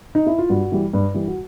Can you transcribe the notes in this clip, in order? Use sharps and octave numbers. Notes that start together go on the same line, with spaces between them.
D#4
E4
F4
G2 F#4
E3 G3
G2
E3 G3
F#4